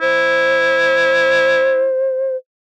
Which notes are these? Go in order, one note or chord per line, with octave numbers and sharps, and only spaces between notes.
E4 C5